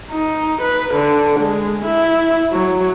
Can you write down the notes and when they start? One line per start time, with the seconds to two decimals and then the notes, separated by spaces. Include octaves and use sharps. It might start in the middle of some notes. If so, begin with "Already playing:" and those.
0.12 D#4
0.62 B4
0.94 D3
1.40 G#3
1.85 E4
2.52 F#3